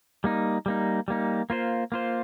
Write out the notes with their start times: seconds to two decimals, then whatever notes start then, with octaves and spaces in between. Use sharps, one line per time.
0.24 G3 A#3 D#4
0.66 G3 A#3 D#4
1.08 G3 A#3 D#4
1.50 A#3 F4 C5
1.92 A#3 F4 C5